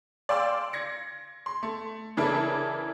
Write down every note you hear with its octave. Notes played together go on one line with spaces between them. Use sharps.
D5 F5 G5 C6 E6
G#6 A#6 C#7
C6
A3
C#3 E3 D4 E4 A4 A#4